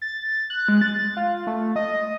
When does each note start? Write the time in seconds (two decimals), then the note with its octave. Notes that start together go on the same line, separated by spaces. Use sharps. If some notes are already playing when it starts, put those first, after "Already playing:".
0.02 A6
0.50 F#6
0.68 G#3
0.81 A6
1.17 F4
1.47 A3
1.76 D#5